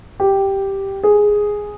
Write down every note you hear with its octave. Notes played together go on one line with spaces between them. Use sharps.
G4
G#4